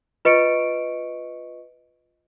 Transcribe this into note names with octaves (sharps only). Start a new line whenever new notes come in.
F4 B4 D#5 C#6 C#7 D7